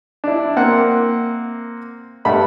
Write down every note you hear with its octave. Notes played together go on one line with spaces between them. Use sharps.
D4 E4
A#3 C4 F#5
G2 A3 F#5 B5